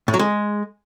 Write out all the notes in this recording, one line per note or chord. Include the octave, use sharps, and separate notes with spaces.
A2
F#3
G#3